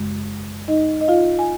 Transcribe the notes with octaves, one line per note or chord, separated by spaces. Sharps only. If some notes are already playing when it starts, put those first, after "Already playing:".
Already playing: F#2 C#3 G#3
D#4 D#5
D#5
F4 F5
G#5